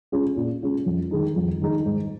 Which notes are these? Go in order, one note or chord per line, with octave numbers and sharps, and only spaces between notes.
G#3 C#4 F4
A#2
G#3 C#4 F4
F2
D#3 G#3 D#4
F2
D#3 G#3 D#4
G#2